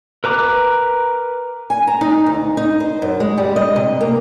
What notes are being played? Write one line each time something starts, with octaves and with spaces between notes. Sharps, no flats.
A#4 B4 A#5 D6 F#6
G#5
A#5
D#4
D2
D#4
C5
F#2
G#3
G3
D#5
C3
A#3